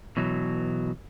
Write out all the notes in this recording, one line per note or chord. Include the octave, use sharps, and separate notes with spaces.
B2 E3 F#3